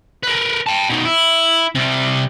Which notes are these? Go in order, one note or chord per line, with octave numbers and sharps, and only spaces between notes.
A#4 B4
G5 A5
B2 D#3
E4
C3 G3